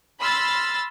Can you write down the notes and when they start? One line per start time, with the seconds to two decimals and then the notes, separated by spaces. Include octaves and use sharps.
0.19 B5 C6 E6 F6 A6